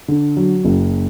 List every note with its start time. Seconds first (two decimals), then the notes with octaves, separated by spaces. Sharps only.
0.08 D3
0.37 F#3
0.65 F#1